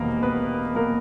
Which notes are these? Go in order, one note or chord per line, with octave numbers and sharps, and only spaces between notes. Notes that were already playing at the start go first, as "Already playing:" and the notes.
Already playing: E1 E2 C3 D#3 A#3 B3 A#4
B3 B4
A#3 A#4